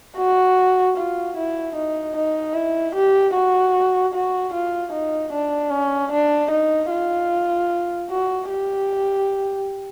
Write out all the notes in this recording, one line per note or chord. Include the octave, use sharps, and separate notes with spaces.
F#4
F4
E4
D#4
D#4
E4
G4
F#4
F#4
F4
D#4
D4
C#4
D4
D#4
F4
F#4
G4